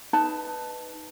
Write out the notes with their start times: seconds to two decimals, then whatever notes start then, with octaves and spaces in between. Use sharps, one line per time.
0.13 D#4 B4 A5